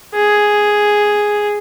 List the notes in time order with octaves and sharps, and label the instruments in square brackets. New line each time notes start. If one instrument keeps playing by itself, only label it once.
[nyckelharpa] G#4